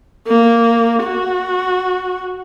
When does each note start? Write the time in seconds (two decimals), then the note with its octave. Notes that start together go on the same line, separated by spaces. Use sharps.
0.27 A#3
1.03 F#4